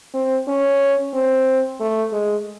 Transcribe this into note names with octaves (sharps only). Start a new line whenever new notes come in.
C4
C#4
C4
A3
G#3